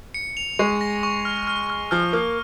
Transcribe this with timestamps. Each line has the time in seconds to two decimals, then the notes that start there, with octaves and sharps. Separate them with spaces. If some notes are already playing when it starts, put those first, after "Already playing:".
0.14 C#7
0.37 F7
0.59 G#3 C#6
0.81 A#6
1.03 C#6
1.25 F6
1.47 F6
1.70 F6
1.91 F3 F6
2.13 A#3 F6